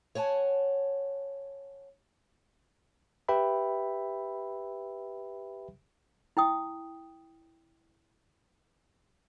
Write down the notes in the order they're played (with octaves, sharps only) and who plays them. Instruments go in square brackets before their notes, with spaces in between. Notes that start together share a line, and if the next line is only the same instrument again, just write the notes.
[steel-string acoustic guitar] C#5 F#5 G#5 A5
[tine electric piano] G4 B4 E5 G5 B5
[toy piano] E4 G5 D#6